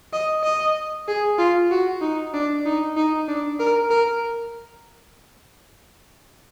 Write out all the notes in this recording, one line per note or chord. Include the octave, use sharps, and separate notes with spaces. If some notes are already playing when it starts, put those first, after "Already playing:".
D#5
D#5
G#4
F4
F#4
D#4
D4
D#4
D#4
D4
A#4
A#4